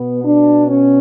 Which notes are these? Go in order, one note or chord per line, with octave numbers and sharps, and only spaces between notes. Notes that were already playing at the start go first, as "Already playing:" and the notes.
Already playing: B2 B3
D4
C#4